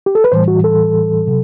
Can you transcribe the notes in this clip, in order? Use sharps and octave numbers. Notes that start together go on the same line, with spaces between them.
G4
A4
B4
A2 E3 G3 C5
F#4
A4
C3 F#3